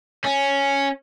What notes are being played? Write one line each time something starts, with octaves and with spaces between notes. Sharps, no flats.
C#4